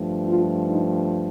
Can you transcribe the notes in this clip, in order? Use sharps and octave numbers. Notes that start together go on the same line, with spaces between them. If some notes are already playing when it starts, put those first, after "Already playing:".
Already playing: G2 F3 A3
F4
D#4